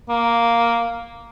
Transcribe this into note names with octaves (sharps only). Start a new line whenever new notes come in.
A#3